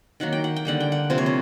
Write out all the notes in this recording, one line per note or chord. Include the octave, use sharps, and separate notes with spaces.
D#3 F#3 A#3 F#5
G5
F#5
G5
D3 G3 A#3 F#5
G5
F#5
C3 F3 A#3 C5
C#5
C5